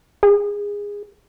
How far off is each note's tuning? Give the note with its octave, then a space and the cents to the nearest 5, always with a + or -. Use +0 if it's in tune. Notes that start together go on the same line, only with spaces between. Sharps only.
G#4 -20